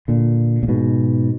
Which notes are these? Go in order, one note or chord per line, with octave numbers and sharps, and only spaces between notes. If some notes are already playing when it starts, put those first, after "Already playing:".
A#2 D3
A#2
G#2 B2